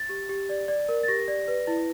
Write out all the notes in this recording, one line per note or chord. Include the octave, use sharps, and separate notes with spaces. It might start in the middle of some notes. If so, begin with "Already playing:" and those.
Already playing: A6
G4
G4
D5
D5
A#4
A6
G4 A#6
D5
B4
E4